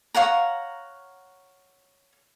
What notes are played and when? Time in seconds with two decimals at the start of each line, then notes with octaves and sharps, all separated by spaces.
0.15 C#5 F5 F#5 A#5